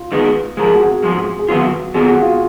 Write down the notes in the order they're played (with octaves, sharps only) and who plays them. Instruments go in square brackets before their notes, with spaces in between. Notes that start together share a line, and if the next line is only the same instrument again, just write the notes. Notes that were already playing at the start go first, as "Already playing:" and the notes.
Already playing: [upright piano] F4
[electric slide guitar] D#3 G#3 B3
[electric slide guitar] G#2 F3 G#3 [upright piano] A#4
[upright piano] G#4
F#4
G#4
[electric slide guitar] G#2 F3 G#3
[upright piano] G#4
[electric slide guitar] D#3 F#3 B3 F4 [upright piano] F#4
[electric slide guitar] D#3 F#3 B3 F4 [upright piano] G#4
[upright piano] F#4
F4